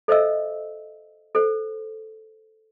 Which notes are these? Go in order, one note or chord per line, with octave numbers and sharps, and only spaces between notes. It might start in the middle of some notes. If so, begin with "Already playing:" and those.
A4 C5 D#5 E5 E6
A4 C5